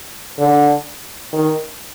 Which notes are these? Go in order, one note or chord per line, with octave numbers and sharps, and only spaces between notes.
D3
D#3